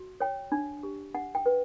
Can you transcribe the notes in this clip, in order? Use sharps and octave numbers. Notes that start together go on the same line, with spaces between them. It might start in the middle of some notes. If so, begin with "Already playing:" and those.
Already playing: F#4
C#5 G5
D4
G4
D4 F#5
G5
B4